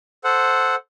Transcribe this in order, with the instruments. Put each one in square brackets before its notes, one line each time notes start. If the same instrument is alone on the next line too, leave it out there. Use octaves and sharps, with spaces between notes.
[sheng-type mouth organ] A4 C5 F#5